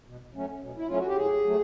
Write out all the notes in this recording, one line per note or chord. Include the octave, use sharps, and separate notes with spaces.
B2
F#3 A3 C#4
B2
E4
F#3 A3 C#4 F4
F#4
G4
A2 G#4
F#3 A3